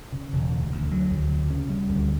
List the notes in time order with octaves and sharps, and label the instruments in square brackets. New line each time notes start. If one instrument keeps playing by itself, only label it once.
[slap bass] C#3
E1
D2
D2
F#3
D2
C#3
C#4
G3
D2